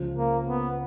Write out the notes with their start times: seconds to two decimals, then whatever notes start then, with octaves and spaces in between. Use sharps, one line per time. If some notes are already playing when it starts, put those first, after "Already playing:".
Already playing: C#2 C#3 F3
0.17 A#3
0.48 B3